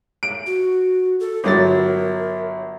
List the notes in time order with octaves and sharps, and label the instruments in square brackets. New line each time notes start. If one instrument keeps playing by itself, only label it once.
[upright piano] D7
[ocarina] F#4
A4
[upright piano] G1 F#3 A6 [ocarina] A#4